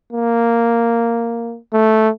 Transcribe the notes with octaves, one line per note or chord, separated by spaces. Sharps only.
A#3
A3